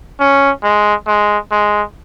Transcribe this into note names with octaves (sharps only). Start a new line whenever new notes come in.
C#4
G#3
G#3
G#3